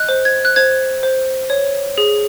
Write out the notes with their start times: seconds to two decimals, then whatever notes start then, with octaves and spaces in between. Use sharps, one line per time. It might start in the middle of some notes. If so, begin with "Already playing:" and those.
Already playing: D#5 F#6
0.09 C5
0.25 G#6
0.45 F#6
0.56 C5 G#6
1.03 C5
1.50 C#5
1.98 G#4